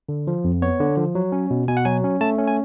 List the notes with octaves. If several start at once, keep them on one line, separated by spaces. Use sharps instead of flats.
D3
F3
F2
B3 C#5
D3
F3
F#3
C#4
B2
B2 G#5
F#5
F#3 G#5
C#4
A3 A5
C#4
G#5